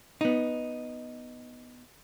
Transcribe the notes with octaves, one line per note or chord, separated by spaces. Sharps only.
B3 D#4